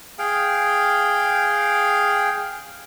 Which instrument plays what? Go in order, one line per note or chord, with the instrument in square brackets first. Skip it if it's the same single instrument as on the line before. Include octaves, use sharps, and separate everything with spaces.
[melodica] G#4 F5 G5